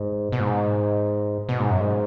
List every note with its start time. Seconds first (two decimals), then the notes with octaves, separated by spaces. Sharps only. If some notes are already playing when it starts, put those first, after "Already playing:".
Already playing: G#2
0.32 B2
0.40 G#2
1.49 B2
1.60 G#2
1.71 F#2
1.80 G#2